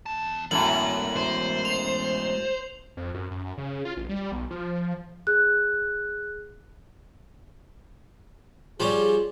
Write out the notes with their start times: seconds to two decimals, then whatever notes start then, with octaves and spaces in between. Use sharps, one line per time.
0.06 E2 A5
0.51 F#2 A2 G#3 B3 F#7
1.16 C5
1.65 F7
2.97 F2
3.14 F#2
3.31 F#2
3.58 C#3
3.85 F4
3.97 A1
4.09 G3
4.32 B1
4.50 F3
5.27 G#4 F#6
8.80 F3 G3 C#4 G#4